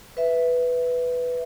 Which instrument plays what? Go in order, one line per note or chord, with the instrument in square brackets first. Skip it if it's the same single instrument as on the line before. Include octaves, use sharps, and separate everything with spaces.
[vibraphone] B4 E5